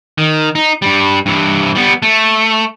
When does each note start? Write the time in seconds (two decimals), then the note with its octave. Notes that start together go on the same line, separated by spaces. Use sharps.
0.18 D#3
0.55 D#4
0.82 G2 G3
1.26 G2 E3
1.75 G3 B3
2.03 A3